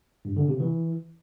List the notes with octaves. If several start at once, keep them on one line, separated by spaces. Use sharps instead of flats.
G2
D3
C3
E3